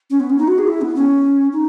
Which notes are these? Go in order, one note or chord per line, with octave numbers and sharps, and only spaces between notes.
C#4
B3
C#4
D#4
F#4
G#4
E4
B3
C#4
D#4